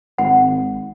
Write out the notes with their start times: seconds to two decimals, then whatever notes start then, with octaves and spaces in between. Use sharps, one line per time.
0.18 G#1 F#5